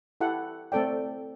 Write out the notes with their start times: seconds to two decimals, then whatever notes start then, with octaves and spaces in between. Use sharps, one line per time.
0.21 E4 G4 A4 F#5
0.72 A3 C4 A4 D5 G5